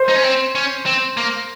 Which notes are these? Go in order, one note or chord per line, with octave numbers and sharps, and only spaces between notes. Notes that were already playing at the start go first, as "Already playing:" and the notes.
Already playing: C5
D#4
C#4
C4
C#4
C4
A#3